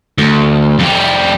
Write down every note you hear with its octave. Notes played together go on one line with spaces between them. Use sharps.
D2
F2 G3